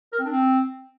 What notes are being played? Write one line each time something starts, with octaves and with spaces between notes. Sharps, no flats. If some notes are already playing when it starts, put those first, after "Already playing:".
A#4
C4
D4
C4